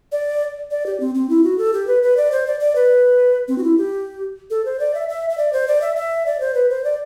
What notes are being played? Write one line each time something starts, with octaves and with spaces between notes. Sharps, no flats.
D5
D5
G4
C4
C4
E4
F#4
A4
G4
B4
B4
D5
C5
D5
D5
B4
C4
F#4
E4
G4
A4
C5
D5
E5
E5
E5
D5
C5
D5
E5
E5
D5
C5
B4
C5
D5